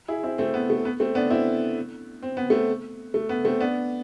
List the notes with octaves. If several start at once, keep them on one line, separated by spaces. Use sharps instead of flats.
E4 G#4
C4 E4
A3 C4
B3
A3
B3
A3 C4
B3 D4
C4 E4
C4
B3
A3 C4
A3
B3
A3 C4
B3 D4